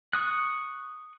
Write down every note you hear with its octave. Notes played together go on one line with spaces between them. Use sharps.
C#6 D#6 F#6